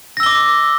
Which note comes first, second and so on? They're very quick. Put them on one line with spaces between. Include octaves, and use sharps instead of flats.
A#6 E6 G7 D6